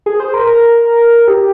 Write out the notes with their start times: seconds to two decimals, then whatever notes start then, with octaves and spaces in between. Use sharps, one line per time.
0.06 G#4
0.20 C5
0.34 A#4
0.47 A#4
1.28 G4